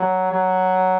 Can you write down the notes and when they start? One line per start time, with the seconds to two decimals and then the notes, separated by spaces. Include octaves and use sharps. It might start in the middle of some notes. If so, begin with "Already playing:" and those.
Already playing: F#3
0.32 F#3